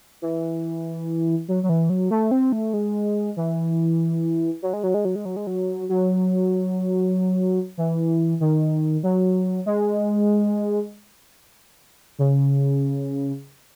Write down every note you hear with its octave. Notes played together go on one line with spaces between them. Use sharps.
E3
F#3
F#3
E3
F#3
A3
C4
A3
G#3
E3
F#3
G#3
F#3
G#3
F#3
G#3
F#3
G#3
F#3
F#3
E3
D#3
F#3
G#3
C#3